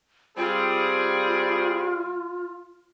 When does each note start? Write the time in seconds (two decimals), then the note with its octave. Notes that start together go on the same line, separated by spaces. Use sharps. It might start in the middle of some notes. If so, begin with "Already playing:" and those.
0.38 G3 C4 F4 G#4